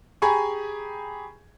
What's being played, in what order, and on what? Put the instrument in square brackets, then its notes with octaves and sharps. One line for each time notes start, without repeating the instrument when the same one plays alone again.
[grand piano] G4 G#4 G#5 A#5 B5 C#6